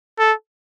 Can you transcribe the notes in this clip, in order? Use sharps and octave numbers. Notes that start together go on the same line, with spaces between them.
A4